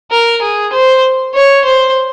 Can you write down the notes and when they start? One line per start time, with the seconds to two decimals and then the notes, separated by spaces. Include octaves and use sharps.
0.11 A#4
0.42 G#4
0.73 C5
1.35 C#5
1.65 C5